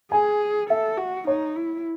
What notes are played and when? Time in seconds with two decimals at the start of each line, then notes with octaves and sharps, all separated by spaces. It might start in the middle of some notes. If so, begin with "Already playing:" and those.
0.12 G#4 G#5
0.70 A4 E5
0.98 F#4
1.27 D#4 C#5
1.56 E4